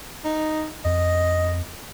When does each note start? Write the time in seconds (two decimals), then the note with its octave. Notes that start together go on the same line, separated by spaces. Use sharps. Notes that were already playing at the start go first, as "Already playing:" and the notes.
0.25 D#4
0.85 F2 D#5